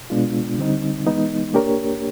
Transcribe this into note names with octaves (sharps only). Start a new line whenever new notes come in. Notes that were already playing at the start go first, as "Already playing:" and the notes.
B2 G#3 B3 D4 F4
D3 G3 C4 D#4
E3 G#3 B3 D#4
A#3 D4 G4 A#4 C#5